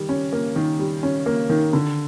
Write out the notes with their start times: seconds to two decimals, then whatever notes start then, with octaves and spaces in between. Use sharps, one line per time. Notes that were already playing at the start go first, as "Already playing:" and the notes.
Already playing: D#3 G3
0.09 C#4
0.33 A#3
0.56 D#3
0.79 G3
1.03 C#4
1.26 A#3
1.50 D#3
1.73 D3